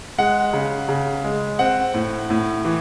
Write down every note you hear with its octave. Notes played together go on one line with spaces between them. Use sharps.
G#3 F#5
C#3
C#3
G#3
C4 F#5
A2
A2
E3